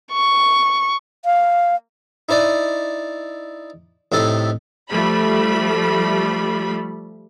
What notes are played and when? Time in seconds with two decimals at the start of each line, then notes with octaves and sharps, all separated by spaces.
0.12 C#6
1.25 F5
2.29 D#4 E4 C5 D5
4.12 A2 C3 D#4 A4 C5
4.89 F3 G3 A3 B5